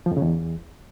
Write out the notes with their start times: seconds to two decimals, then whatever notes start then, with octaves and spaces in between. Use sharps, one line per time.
0.06 F3
0.11 F2
0.17 C#3
0.22 E2